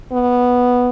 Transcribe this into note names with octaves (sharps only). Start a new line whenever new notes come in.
B3